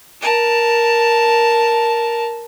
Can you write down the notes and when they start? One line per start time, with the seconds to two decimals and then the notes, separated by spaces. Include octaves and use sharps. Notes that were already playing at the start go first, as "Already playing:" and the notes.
0.21 A#4 A5